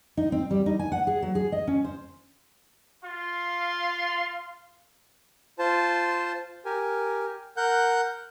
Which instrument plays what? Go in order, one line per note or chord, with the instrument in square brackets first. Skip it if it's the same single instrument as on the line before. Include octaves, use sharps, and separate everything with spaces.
[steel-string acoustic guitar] D#4
C4
G3
D#4
G#5
F#5
G#4
F#3
G#4
D#5
C#4
C5
[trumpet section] F4 F5 C6
[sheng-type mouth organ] F4 C5 A5
G4 A#4 G#5
A#4 F#5 F#6 G6